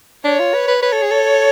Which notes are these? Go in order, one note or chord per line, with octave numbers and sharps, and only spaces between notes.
D4 C#5
F4
B4
B4
B4 C#5
A4
G#4
A4